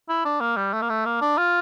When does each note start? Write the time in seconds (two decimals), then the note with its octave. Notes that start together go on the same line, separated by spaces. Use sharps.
0.09 E4
0.25 D4
0.41 A#3
0.57 G3
0.73 A3
0.82 A#3
0.89 A3
1.05 A#3
1.21 D4
1.38 F4